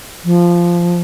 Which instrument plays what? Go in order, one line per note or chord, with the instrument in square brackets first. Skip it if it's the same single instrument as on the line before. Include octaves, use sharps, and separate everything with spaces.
[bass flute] F3